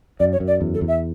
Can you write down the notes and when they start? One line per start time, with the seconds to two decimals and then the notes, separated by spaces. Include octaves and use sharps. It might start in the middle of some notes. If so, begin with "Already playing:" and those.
0.20 F#2 D5
0.33 C#5
0.40 F#2
0.48 D5
0.61 E2
0.74 A4
0.81 E2
0.88 E5